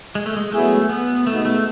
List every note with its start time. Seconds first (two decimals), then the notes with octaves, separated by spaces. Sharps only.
0.15 G#3
0.26 A3
0.37 G#3
0.52 F#3 A3 B3 E4 G#4
0.89 B3
1.27 B2 G#3 A3 B3 D#4
1.45 A3